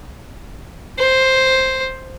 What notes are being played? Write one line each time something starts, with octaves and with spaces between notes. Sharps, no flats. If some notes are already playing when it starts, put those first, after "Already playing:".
C5